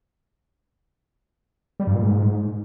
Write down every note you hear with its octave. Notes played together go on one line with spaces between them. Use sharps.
G3
G2
A#2
G#2